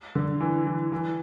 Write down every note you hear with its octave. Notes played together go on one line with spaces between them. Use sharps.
D3
E3
E3
E3